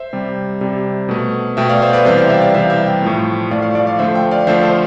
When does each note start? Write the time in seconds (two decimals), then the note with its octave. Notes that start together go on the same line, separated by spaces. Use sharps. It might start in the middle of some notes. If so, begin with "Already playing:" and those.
Already playing: C5 E5
0.13 C3 G3
0.61 C3 G3
1.09 B2 A3
1.57 B2 A3 E5 G5
1.69 D5 F5
1.82 C5 E5
1.93 B4 D5
2.05 C3 E3 G3 C5 E5
2.18 D5 F5
2.29 E5 G5
2.42 D5 F5
2.54 C3 E3 G3 C5 E5
2.70 E5 G5
2.86 E5 G5
3.02 A2 F3 A3
3.50 A2 F3 A3 D5 F5
3.62 D5 F5
3.75 D5 F5
3.86 D5 F5
3.99 D3 F3 A3 C5 E5
4.15 E5 G5
4.31 D5 F5
4.47 D3 F3 A3 C5 E5
4.63 A4 C5